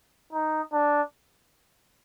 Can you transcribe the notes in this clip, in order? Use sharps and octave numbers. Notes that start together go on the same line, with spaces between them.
D#4
D4